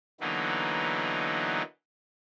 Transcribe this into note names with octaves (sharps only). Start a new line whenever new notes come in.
D3 E3 F#3 A#3 B3 D#4